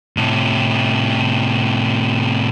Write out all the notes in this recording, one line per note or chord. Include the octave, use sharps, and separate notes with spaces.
A2 C3